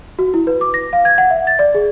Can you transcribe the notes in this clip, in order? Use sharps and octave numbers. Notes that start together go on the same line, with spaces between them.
F#4
E4
B4
D6
A#6
F5
G#6
F#5
E5
A6
D5
G#4